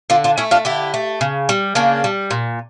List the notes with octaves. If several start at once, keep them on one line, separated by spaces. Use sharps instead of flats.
D3 D4 F4
D4 F4
A3 C#4 E4
D4 F4
D3 E4 G4
A3
C#3
G3
C#3 A#3 D4
G3
A#2